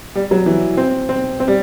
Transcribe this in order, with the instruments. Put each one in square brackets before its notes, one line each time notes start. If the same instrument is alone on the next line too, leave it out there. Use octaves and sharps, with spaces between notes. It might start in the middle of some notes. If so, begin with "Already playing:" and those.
[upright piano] G3
F#3
E3
C4
C4
C4
G3